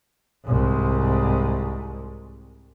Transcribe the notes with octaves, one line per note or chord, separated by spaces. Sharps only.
C2 G#2